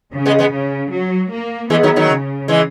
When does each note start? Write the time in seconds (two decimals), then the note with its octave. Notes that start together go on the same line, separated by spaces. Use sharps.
0.13 C#3
0.26 G#3 B3
0.39 G#3 B3
0.52 C#3
0.92 F#3
1.32 A#3
1.70 E3 G#3 B3
1.83 D#3 F#3
1.96 D#3 F#3
2.10 C#3
2.48 E3 G#3